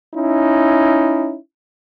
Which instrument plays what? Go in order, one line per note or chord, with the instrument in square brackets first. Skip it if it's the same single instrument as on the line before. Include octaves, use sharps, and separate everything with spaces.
[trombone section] C#4 D#4 E4